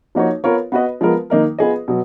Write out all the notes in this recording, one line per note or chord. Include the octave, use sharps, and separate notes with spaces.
F3 A#3 D#4 F#4 C#5
B3 F4 A#4 C#5
B3 F#4 B4 D#5
F3 G#3 B3 F4 A#4
D#3 A#3 D#4 A#4
B3 F4 G#4 D#5
B2 F#3